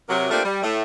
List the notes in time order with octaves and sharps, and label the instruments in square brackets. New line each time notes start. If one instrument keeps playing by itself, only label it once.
[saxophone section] C3 F#3 A#4
A3 A#3 C4 D4 F4 G4
G3
A2 A3